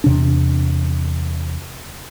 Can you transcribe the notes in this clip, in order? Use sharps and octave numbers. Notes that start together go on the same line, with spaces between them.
E2 C3 D4